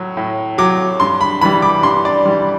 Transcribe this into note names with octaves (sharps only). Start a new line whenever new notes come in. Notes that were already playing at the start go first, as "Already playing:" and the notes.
Already playing: A2 F#3
A2
F#3 D6
G2 C6
B5
E3 G3 B5
D6
G2 C6
D5
E3 G3